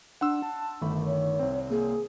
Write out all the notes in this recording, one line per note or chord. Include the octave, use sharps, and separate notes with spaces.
D4 F#5 C6 E6
A5
G1 D#3 A3 B5
C#5
C2 C4
A#3 G#4